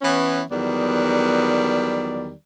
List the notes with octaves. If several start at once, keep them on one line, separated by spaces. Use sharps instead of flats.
E3 B3 C#4
E2 D#3 F#3 G3 B3 D5